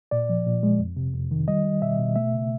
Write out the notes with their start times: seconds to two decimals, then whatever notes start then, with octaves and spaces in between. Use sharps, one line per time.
0.11 A#2 D5
0.29 F3
0.46 A#2
0.63 G#3
0.79 F2
0.97 C3
1.14 F2
1.31 D#3
1.48 G3 D#5
1.65 G3
1.82 B2 E5
1.99 B2
2.16 A3 E5
2.33 C#3